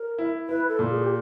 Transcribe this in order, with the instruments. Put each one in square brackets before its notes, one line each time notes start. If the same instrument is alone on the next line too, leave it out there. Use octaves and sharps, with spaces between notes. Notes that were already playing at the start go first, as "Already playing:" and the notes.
Already playing: [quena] A#4
[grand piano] E4
[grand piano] E4 [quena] B4
[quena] A4
[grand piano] A#2
[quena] G#4
G4